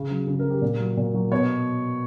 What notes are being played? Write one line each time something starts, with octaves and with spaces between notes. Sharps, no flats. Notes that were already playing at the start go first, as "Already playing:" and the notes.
Already playing: C#3
F#3
C#3
A#4
F#3
G4
A#2
F#3
A#2
F#3
B2 C#5